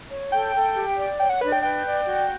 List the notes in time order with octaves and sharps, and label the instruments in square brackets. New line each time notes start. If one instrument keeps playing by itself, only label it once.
[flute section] C#5
[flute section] A4 [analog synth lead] G5
[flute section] A4
G4
D5
[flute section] C#5 [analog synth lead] G5
[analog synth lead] F#5
[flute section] D4 [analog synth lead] B4
[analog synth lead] G5
[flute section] B4 [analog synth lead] G5
[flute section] D5
F#4